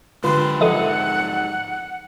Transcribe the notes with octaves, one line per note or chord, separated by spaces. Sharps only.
G#2 D3 F4 G4 B4 C6
F3 A4 D#5 E5 F#5